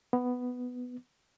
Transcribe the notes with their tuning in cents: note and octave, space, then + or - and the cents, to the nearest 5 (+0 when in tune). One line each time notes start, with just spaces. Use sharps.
B3 +5